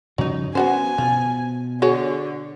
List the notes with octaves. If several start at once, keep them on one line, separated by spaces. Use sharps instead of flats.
G2 C#3 F3 F#3 D#4
B3 C#4 F#4 C5 G#5
B2 F3
D3 F#4 G#4 C#5